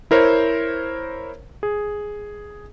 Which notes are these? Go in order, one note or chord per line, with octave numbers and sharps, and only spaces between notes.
E4 A#4 C5 C#5
G#4